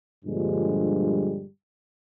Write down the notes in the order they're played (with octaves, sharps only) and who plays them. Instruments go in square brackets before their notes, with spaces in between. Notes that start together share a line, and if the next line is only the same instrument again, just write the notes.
[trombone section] G2 A#2 D3 F3 G3 G#3